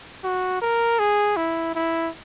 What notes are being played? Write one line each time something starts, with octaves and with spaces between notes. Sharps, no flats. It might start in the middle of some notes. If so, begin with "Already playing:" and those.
F#4
A#4
G#4
E4
E4